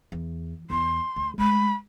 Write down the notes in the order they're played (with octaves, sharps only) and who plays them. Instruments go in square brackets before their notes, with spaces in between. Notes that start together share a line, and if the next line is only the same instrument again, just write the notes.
[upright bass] E2
[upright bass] E2 B3 [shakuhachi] C6
[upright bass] D2
[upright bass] G#3 A3 [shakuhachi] B5